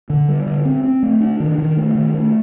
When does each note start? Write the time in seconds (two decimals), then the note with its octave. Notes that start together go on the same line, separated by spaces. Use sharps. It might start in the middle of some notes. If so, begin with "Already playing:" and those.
0.10 D3
0.28 G3
0.47 D3
0.65 C4
0.83 C4
1.03 A3
1.21 D4
1.40 D#3
1.58 D#3
1.77 A3
1.95 D#3
2.14 A3